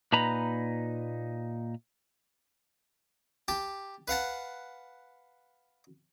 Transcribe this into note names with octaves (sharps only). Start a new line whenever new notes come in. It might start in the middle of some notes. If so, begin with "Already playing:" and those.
A#2 D#4 B4 A#5 B5
G4 A5
B4 F5 F#5 A5